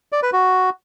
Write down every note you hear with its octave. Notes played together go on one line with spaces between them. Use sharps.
D5
B4
F#4